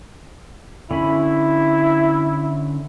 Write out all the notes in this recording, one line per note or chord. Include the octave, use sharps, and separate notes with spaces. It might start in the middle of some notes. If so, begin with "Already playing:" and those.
D3 C#4 E4 B5